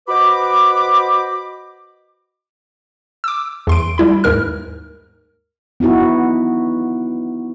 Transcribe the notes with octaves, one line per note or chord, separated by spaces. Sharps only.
F#4 B4 C5 D#5 B5 D6
D6 E6
E2 C6 D7
G3 E4 B5
D#2 G#2 A#4 F6
B3 D#4 E4 F#4